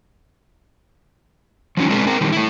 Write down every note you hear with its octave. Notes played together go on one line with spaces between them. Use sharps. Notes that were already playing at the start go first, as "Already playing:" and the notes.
F3 F#3 A#3 C#4 D#4
G#3 C4 D4 E4 G#4 A#4
C4 A#4
D#3 E3 G3
A3 E4